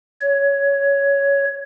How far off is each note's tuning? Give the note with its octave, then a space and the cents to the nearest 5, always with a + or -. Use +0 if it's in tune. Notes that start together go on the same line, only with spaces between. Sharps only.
C#5 +10